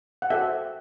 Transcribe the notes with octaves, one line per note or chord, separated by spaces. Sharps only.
F#5
F#4 A4 C5 E5 G5